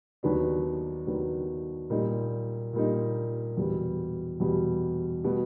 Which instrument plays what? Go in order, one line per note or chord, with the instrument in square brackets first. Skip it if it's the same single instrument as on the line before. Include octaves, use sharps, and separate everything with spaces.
[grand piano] D#2 D#3 F#3 B3 D4
D#2 D#3 F#3 B3 D4
A#2 G3 A#3 D#4
A#2 G3 A#3 D#4
E2 B2 G3
E2 B2 G3
B2 G3 B3